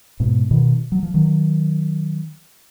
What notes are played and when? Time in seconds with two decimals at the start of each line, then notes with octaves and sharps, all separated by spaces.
0.20 G#2 B2
0.51 B2 D#3
0.92 F#3
1.03 F3
1.14 D#3 F#3